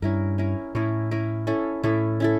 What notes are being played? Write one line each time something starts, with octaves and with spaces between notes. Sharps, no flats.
G2 C#4 E4 A#4
C#4 E4 A#4
A2 C#4 E4 A#4
C#4 E4 A#4
C#4 E4 A4
A2 C#4 E4 A4
C#4 E4 A4